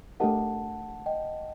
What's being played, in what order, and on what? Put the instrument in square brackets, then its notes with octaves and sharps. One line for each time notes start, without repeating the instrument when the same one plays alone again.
[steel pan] A3 D4 G4 A#4 D#5 [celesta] F#5 A5
[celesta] D#5 G5